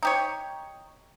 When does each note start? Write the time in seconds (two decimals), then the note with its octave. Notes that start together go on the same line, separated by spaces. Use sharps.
0.03 D#4 G4 C#5